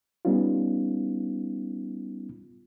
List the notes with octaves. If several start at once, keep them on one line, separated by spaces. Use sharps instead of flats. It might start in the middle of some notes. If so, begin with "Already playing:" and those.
G3 B3 C#4 D#4 F4